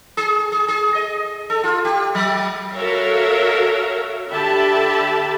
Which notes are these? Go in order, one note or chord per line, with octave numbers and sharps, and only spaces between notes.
G#4
G#4
G#4
D#5
A4
F4
G4
F#3
F#4 A4 A#4 C#5 E5 F5
D3 G4 E5 A5 B5